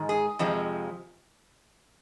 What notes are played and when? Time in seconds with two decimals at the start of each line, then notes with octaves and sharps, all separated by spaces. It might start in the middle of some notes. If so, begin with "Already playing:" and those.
Already playing: G#2 D#3 G#3
0.09 G#4
0.39 F2 C3 F3 G#3